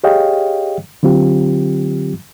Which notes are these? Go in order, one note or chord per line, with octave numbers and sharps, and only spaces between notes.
G4 G#4 C#5 D#5 F5 G5
D3 F#3 C4 F4 G4